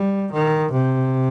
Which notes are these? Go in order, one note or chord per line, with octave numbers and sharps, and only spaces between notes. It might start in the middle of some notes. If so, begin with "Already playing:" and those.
Already playing: G3
D#3
C3